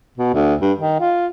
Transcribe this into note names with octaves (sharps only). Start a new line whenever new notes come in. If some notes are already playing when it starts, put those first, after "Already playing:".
B2
D2
G2
D#3
F4